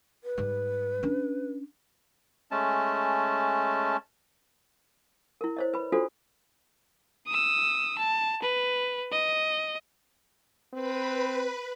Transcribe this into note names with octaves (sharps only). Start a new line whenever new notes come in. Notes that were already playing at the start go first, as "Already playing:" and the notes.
B4
G#2 G3
C#4 D4
G#3 A3 C#4 A5
E4 A#4
C5 C#5 D#5
B4 B5
D4 F4 F#4 A4 C5
D#6 E6
A5
B4
D#5
C4 B4 B5